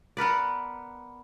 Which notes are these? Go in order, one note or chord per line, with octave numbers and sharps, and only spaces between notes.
B3 A#4 B4 D5